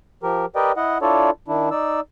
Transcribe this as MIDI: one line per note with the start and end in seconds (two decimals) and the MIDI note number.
0.23 0.46 53
0.23 0.46 67
0.23 0.46 70
0.56 0.72 67
0.56 0.72 70
0.56 0.72 71
0.56 0.72 74
0.56 0.72 75
0.56 0.72 79
0.77 0.98 64
0.77 0.98 75
0.77 0.98 78
1.02 1.30 62
1.02 1.30 64
1.02 1.30 65
1.02 1.30 69
1.02 1.30 73
1.02 1.30 74
1.48 1.69 51
1.48 1.69 62
1.48 1.69 64
1.71 2.00 63
1.71 2.00 74
1.71 2.00 88